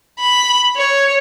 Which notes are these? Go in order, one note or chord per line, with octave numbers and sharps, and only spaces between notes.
B5
C#5